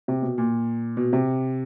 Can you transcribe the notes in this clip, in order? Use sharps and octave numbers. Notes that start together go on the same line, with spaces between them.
C3
B2
A#2
B2
C3